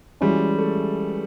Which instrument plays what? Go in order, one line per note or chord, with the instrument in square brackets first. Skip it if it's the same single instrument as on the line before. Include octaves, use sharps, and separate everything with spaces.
[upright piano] E3 G#3 C#4 F#4 [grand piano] G3
[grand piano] A3